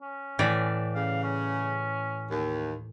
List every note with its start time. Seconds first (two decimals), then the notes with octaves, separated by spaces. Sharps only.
0.02 C#4
0.39 A2 E3 D5
0.95 C#3 F5
1.24 C#4
2.29 D#2